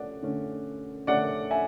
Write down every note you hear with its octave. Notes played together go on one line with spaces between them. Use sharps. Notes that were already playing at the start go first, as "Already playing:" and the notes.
Already playing: A3 C#4 D5 F#5
D3 A3 C#4
D3 A3 C#4 D5 F#5
E5 G#5